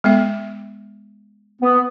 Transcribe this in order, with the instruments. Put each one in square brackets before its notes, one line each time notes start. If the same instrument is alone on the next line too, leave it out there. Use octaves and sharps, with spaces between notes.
[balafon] G#3 B3 E5
[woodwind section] B3